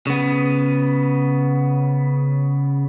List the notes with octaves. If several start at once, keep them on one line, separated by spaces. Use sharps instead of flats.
C#3 B3